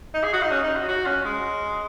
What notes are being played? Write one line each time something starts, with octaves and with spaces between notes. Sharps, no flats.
D#4
G#4
F#4
D#4
C#4
D#4
F#4
F#4
C#4
G#3